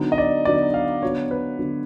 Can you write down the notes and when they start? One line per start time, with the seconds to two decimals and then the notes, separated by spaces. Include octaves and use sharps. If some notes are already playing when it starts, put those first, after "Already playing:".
Already playing: D3 F#3 B3 D#4
0.12 D#5
0.18 D5
0.45 D3 F#3 B3 D#4 D5
0.74 F5
1.02 D3 F#3 B3 C#5
1.31 B4
1.59 D3 F#3 B3